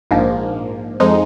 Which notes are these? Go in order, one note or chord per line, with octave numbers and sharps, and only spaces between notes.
A#1 G#2 F3 A#3
F2 F3 G#3 D#4